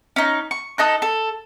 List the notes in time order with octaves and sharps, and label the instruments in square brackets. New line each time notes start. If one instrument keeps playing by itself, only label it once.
[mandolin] C#4 D#4
C#6
D#4 A4 D#5 F#6
A4